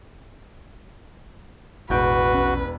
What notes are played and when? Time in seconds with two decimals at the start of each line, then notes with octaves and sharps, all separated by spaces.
1.90 E1 A1 F#4 B4 G6 D7
2.34 A#1 C#4